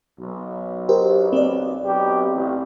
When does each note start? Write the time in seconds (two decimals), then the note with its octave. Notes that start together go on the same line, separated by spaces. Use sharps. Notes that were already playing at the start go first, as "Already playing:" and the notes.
0.19 B1
0.89 G4 A#4 C5
1.33 C4 D5
1.85 B1 G4
2.34 A1